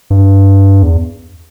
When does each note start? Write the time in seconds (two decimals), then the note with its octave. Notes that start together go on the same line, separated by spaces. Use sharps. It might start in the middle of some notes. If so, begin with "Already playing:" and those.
0.10 G2
0.83 E2